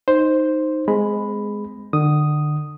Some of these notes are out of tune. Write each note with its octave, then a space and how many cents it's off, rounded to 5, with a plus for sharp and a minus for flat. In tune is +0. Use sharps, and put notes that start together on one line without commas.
D#4 +0 C5 +0
G#3 +0 C4 -40 B5 +5
D3 +35 D#6 +0